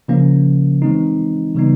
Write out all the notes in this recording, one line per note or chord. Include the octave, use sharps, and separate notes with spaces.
C#3 F3 A#3 C#4
E3 G#3 C4 D#4
C#3 E3 G3 B3 D#4